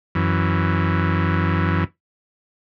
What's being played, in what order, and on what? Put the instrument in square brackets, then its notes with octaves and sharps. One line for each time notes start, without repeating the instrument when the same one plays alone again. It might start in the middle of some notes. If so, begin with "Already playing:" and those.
[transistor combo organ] F#2 E3